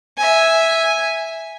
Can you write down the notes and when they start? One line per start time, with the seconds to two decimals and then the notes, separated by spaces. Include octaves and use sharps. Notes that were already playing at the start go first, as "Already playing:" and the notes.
0.17 E5 G#5